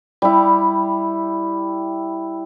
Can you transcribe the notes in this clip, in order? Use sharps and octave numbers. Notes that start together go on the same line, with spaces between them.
G3 E4